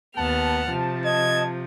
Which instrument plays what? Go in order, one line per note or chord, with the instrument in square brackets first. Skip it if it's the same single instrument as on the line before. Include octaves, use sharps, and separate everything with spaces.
[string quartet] D#2 B3 F6 [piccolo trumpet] F#5 [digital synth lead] A5
[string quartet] C3 F3
[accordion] D#5 [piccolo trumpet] G#6